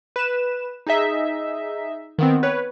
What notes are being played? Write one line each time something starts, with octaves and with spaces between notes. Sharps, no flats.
B4 E7
D#4 G#4 D#5 E5
D#3 B3 C4
B4 C#5